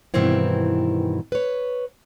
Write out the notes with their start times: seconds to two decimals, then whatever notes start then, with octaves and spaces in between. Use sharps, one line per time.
0.14 G2 B2 D#3 E3 C4 E4
1.32 B4 C#5